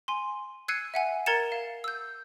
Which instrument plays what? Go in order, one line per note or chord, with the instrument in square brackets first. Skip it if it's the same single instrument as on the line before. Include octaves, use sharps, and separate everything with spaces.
[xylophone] G#5 C6
E6 F#6 G#6 C7 C#7 D#7
E5 F#5 G#5
A#4 A#5 G#6 A6 C#7 E7
F5
E6 G6